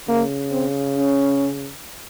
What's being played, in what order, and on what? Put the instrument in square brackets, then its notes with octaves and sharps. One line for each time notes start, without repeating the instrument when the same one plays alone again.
[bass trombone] C#3 [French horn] A#3
[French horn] C4
C#4